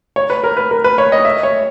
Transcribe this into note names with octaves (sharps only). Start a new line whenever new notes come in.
C#5
B4
A#4
B4
A#4
B4
C#5
D#5
E5
C#5